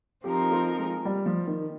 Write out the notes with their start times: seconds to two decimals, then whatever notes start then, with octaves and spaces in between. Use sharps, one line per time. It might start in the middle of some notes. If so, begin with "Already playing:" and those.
0.24 F3 C4 D#4 G4 A#4
0.51 F4
0.79 G#3
1.05 G3
1.26 F3
1.47 D#3